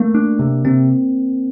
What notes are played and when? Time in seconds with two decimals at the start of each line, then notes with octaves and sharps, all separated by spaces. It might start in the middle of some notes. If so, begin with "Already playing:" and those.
Already playing: A3 A#3
0.15 D4
0.39 C3
0.65 C3 C4